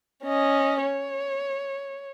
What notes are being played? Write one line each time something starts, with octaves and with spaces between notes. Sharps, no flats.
C#4 D#5
C#5